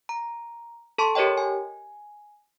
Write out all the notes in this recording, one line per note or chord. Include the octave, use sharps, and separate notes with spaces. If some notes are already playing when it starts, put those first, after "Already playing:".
A#5
A4 A5 C6 C#6
G4 A#4 C#5 D#5 G5
G#5